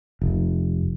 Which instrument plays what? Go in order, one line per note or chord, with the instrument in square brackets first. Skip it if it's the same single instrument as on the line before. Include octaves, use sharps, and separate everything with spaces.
[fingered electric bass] F1